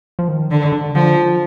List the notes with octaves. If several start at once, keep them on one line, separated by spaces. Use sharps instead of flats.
F3
D#3
D3
D3
D3 F3
F3